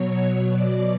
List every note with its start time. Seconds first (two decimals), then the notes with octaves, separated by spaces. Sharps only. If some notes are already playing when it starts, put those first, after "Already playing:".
Already playing: B2 F#3 C#5
0.49 D5